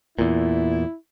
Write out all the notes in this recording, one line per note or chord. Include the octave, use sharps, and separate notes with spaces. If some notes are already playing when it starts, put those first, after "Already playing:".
E2 A#2 E4